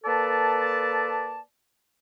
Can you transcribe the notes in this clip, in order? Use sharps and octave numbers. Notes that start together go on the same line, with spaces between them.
A#3 A4 B4 D5 A5